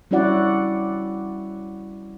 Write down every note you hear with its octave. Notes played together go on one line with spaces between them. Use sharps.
G3 C#4 E4 F#4 D5 F#5